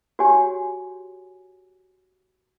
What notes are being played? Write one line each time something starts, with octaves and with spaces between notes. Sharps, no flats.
F#4 G4 C#5 G#5